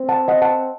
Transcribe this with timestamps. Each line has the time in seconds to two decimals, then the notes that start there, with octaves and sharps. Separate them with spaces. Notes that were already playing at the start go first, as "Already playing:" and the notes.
Already playing: C4
0.09 F#5 A5
0.28 D#5 F#5
0.42 F#5 A5